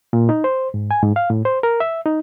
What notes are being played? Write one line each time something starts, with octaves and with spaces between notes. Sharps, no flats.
A#2
D#4
C5
G#2
G#5
G#2
F5
A2
C5
A#4
E5
D#4